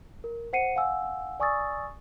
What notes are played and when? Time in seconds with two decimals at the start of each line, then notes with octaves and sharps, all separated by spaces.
0.24 A#4
0.53 C5 F#5 C7 C#7 D#7
0.76 F5 F#5 G#5 E6
1.40 D5 G#5 C#6 D#6 E6 A6